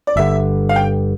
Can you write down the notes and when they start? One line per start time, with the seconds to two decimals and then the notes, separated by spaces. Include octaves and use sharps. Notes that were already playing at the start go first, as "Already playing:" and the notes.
0.07 D5
0.16 G1 G2 D3 E5
0.69 F5
0.76 G5